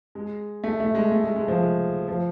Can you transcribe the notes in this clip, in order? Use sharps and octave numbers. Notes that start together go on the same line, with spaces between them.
G#3
A3
A3
G#3
A3
G#3
G#3
F3
G#3
F3